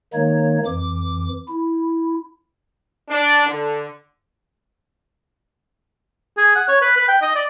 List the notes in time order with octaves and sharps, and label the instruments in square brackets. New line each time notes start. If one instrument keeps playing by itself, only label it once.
[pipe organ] D#3 G#3 A#3 D#4 C#5
F2 E3 D6
E4
[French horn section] D4
D3
[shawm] G#4
F#5
C#5
B4
B4
G5
D#5
D5